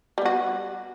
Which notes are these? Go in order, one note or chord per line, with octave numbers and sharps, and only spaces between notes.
G3 B3 F#4